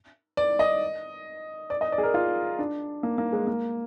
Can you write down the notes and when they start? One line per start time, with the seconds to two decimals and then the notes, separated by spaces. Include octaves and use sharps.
0.37 D5
0.59 D#5
1.70 D5
1.81 D#5
1.92 D5
1.98 G#4
2.03 A#4
2.14 F4
2.59 D4
3.03 A#3
3.18 A#3
3.33 G#3
3.47 A#3